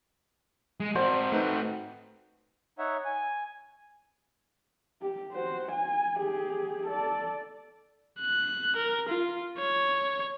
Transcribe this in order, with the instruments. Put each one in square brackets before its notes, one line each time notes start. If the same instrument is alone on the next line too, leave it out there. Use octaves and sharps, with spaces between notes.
[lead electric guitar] G#3
[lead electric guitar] C4 F#4 [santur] C5 [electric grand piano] D5
[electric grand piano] A3 D#4 B4
[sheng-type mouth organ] D#4 C#5 E5 F#5
G#5
[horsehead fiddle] G4
F#4 C5
G#5
G4 G#4
A4 D5
[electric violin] F#6
A#4
F4
C#5